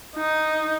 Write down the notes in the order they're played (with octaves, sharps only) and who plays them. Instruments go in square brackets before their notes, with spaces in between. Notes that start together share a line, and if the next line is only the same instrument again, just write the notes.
[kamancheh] D#4